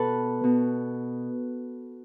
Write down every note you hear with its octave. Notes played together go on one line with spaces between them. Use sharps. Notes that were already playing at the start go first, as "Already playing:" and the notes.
Already playing: B2 A4 B4
B2